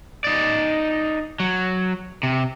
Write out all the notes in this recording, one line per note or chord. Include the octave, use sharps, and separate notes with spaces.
D#4 D5
F#3
C3